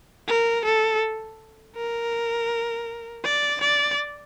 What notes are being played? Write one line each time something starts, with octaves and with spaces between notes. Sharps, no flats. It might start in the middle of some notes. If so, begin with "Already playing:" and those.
A#4
A4
A#4
D5
D5